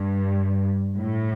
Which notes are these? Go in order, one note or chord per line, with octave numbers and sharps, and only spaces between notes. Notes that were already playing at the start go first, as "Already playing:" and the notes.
Already playing: G2
A2